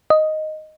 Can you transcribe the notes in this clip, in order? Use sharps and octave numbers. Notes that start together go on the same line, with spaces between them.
D#5